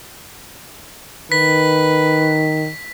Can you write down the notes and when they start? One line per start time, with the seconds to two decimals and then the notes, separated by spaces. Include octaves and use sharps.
1.32 D#3 B4 B6